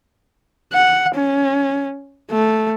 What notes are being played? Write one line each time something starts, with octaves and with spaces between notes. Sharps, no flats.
F#5
C#4
A3